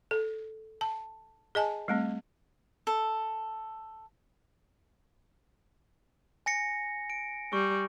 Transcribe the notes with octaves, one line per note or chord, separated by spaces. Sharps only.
A4
A5
G#4 D#5 G#5 A5
G3 A3 C4
A4
G#5 A#6 C#7
D7
G3 C#6